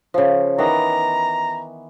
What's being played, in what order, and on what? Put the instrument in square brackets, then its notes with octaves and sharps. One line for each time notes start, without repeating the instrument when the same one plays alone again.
[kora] C#3 F3
[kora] D#3 E3 B3 [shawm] A#5